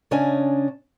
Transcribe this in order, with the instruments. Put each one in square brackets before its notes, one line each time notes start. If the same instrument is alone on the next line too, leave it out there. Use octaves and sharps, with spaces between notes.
[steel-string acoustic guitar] C#3 C#4 D4 D#5 G#5